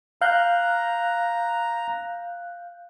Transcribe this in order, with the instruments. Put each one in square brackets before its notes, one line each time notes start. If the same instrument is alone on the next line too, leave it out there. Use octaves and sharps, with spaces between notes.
[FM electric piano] F5 F#6 G6 [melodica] A#5